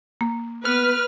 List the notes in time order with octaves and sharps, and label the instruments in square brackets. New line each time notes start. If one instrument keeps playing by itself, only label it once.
[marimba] A#3
[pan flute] B3 [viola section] B4 [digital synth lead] F6